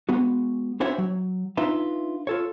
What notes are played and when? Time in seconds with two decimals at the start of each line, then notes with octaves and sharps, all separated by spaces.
0.09 G#3 B3 F#4
0.80 C#4 D4 E4 F#4 C5 C#5
0.98 F#3
1.57 D4 D#4 F4 B4 E5
2.27 F4 A4 C#5